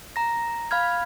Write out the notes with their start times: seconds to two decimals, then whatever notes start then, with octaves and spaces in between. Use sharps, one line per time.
0.16 A#5 A#6
0.71 F5 B5 F6 G#6